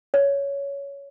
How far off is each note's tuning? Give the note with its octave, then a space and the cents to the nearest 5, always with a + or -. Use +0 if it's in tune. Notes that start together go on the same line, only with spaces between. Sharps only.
C#5 +15